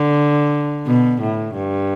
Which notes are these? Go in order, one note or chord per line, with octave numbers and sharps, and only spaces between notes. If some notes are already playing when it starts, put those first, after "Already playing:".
Already playing: D3
B2
A2
G2